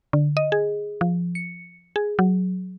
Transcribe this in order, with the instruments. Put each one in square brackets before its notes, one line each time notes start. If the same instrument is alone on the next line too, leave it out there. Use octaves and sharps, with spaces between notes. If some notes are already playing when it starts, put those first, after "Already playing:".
[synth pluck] D3
D#5
G#4
F3
C#7
G#4
F#3